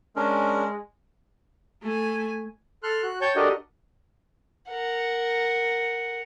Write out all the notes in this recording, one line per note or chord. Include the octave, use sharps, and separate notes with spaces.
G#3 C#4 D4 A#4
A3 G#5
A4 C6 F6 F#6
F#4 F#6
C#5 G5 A5 C#6 G6
D4 F#4 G4 A4 A#4 D#5
A#4 F#5